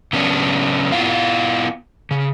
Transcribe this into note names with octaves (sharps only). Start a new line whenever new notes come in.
C#3 F#3 B3 C#4 D4
B3 E4 F4 F5
C#3